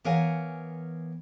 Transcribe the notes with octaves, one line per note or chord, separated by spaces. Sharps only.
E3 B3 A#4 C#5 F5 G#5